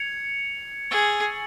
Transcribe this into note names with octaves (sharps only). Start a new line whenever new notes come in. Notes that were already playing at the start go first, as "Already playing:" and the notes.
Already playing: G#6 C#7 F7
G#4 C#6 E6 A6 C#7 F#7